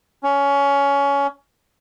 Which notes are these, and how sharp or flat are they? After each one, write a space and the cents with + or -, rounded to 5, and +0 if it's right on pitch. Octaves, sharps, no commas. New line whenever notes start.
C#4 +20